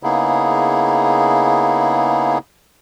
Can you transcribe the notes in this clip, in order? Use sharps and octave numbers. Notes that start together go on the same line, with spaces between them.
C#3 A#3 B3 D#4 E4 G#4